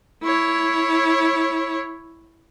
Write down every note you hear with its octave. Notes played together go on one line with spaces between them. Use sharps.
E4 C#5